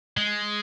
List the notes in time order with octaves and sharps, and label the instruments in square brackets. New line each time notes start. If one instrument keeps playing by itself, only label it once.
[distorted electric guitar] G#3